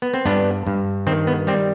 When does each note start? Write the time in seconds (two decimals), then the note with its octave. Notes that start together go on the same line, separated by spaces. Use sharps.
0.02 B3
0.14 C4
0.25 G2 B3 D4
0.67 G2
1.07 D#3 C4
1.27 B3
1.47 G3 C4